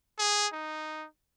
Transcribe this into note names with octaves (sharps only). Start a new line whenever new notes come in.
G#4
D#4